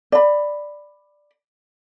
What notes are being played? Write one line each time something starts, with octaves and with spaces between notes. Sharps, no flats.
D5 B5